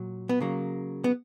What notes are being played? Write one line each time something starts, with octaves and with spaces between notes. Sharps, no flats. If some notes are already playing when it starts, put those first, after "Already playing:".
Already playing: A#2 F#3
B3
C#3 F#3 A#3
B3